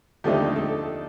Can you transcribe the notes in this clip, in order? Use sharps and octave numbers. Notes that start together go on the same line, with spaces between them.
D#2 D3 F3 A3 D#4 G4
A4